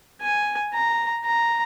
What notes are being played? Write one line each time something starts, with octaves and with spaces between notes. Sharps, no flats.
G#5
A#5
A#5